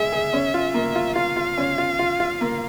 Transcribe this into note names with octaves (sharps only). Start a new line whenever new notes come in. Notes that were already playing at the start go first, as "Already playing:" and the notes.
Already playing: G#3 G#4 E5
G#4
C#4
F4
A#3
F4
F4 F5
F4
C#4
F4
F4
F4
A#3